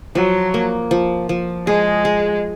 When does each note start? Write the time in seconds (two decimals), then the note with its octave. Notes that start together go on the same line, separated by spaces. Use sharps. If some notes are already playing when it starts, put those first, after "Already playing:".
0.15 F3 F#3
0.54 A#3
0.91 F3
1.29 F3
1.67 G#3 G#4
2.05 G#4